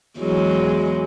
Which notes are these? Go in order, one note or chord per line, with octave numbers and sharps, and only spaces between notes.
E2 F#3 G#3